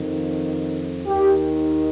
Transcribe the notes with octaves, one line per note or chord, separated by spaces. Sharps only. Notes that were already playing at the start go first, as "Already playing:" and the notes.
Already playing: F2 D#3
D#2 D#3 G4